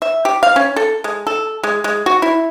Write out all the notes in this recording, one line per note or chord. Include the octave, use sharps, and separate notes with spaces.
E5
G4
F5
C#4
A4
G#3
A4
G#3
G#3
F#4
E4